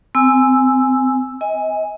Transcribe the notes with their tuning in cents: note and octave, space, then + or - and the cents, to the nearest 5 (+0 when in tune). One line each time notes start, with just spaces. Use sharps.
C4 -25 G#5 +0 E6 +0
D#5 +35 G#5 -15